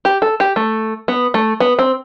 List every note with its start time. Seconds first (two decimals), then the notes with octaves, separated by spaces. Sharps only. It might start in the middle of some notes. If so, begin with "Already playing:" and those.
0.05 G4
0.22 A4
0.40 G4
0.56 A3
1.08 B3
1.34 A3
1.60 B3
1.79 C4